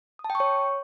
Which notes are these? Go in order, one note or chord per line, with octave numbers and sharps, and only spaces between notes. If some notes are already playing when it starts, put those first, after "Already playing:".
D#6
A5
G5
C#6
C#5